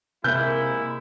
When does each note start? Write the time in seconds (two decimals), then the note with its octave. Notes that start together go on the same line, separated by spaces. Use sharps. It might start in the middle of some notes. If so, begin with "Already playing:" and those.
0.24 C3 G#3 A#3 E4 G6